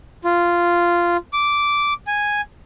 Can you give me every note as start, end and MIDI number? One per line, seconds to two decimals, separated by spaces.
0.25 1.17 65
1.33 1.94 86
2.07 2.41 80